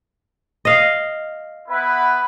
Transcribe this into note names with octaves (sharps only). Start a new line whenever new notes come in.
D#5 F5
B3 E4 B4